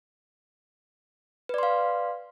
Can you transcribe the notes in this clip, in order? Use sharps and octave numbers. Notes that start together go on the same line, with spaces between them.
B4 D5 F5 C6